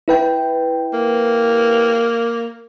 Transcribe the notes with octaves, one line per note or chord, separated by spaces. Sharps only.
E4 B4 G5
A#3